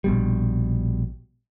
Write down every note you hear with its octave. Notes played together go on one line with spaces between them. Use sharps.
A#1 B2 G3